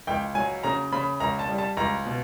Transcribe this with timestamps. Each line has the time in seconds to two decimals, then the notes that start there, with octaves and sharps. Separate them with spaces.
0.07 C#2 G5
0.35 F#3 G#5
0.63 C#3 A#5
0.92 C#3 B5
1.20 C#2 A#5
1.39 A5
1.49 G3
1.58 A5
1.77 C#2 A#5
2.06 B2